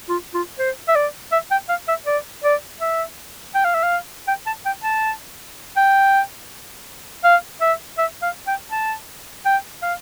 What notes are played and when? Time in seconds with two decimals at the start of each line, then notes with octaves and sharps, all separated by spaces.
0.09 F4
0.34 F4
0.59 C5
0.88 E5
0.95 D5
1.32 E5
1.51 G5
1.69 F5
1.88 E5
2.06 D5
2.44 D5
2.80 E5
3.55 G5
3.64 F5
3.75 E5
3.83 F5
4.28 G5
4.46 A5
4.66 G5
4.83 A5
5.77 G5
7.24 F5
7.61 E5
7.98 E5
8.22 F5
8.47 G5
8.71 A5
9.45 G5
9.82 F5